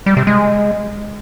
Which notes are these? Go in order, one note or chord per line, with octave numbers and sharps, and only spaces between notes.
G3
C3
G#3